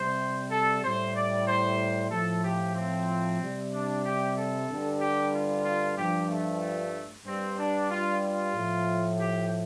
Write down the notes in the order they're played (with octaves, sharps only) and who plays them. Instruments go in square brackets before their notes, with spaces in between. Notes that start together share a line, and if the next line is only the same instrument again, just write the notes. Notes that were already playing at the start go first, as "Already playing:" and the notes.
Already playing: [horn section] C3 G3 C5
A4
A2 G3 C5
D5
C5
A2 F3 A4
G4
C4
C3 G3
D4
G4
A4
G2 D3 G3
G4
F4
F4
G2 F3 G4
A3
G2 G3 C4
D4
F4
F4
A2 F3
G4